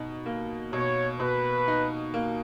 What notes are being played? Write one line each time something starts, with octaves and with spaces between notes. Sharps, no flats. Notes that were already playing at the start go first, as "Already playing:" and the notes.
Already playing: B2 D#4
A#3
B2 C#5
B2 B4
D#4
A#3